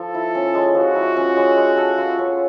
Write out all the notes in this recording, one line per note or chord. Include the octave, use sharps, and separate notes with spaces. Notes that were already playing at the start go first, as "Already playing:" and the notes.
Already playing: F3 A4
E4
C#4
G#3
F3 F#4
E4
C#4
G#3
G#3
A4
F4
C#4